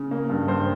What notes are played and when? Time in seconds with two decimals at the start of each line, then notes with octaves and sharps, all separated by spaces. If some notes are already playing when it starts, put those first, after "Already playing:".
Already playing: C#3
0.11 A#3
0.30 G2
0.48 G2 C5